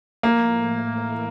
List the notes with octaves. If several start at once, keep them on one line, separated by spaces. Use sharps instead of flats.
A2 F3 A3 A#3
A2 E3 A3 E4 A#4